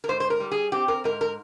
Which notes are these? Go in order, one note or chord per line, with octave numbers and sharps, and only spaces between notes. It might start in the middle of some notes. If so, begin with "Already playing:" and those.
A#4
G#2 C5
C5
A#4
G3
G#4
C4 G4
A#4
G#2 A#4
A#4